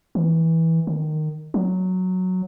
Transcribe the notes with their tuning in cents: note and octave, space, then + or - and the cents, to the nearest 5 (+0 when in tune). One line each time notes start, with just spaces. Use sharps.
E3 -15
D#3 -15
F#3 -5